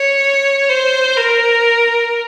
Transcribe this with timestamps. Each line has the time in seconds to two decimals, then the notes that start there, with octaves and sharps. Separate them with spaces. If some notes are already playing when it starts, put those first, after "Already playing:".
Already playing: C#5
0.69 C5
1.17 A#4